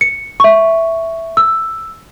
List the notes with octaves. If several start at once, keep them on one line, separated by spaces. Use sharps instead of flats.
C#7
E5 C#6
E6